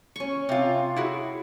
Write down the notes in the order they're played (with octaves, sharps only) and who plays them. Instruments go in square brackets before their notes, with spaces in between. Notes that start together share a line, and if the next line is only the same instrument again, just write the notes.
[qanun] C#4 C#6
[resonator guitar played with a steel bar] C3 F4
E4 F#4 G#4